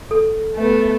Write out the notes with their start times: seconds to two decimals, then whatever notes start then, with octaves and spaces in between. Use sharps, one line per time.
0.11 A4
0.55 A3 B3